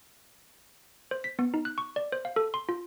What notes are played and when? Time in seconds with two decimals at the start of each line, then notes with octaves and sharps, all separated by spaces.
1.11 C5
1.24 B6
1.39 B3
1.54 D#4
1.65 F#6
1.78 C#6
1.96 D5
2.12 C5
2.25 F5
2.36 A4
2.54 C6
2.69 F4